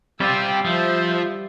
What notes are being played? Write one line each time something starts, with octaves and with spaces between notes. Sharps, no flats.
G3 C4 F4 G4 E6
F3 C5 E5